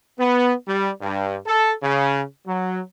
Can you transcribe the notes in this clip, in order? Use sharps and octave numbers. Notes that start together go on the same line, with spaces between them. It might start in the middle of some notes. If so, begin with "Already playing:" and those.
B3
G3
G2
A4
C#3
F#3